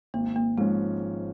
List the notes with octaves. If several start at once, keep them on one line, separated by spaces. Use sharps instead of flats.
G#1 A#3
A#3
G#2 F3 G#3 C#4